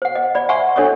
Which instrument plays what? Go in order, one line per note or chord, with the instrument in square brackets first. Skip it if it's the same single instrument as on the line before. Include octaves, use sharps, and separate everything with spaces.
[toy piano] C5 F#5
D#5
D5 B5
E5 F#5 G#5 C6 C#6
D4 A4 C#5 D#5 C#6